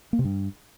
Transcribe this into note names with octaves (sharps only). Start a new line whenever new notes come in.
A#3
C3
G2